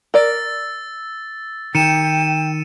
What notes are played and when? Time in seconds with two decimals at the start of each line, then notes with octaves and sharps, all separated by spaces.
0.14 A#4 D5 E6 A6
1.75 D#3 G5 C#7 D#7 E7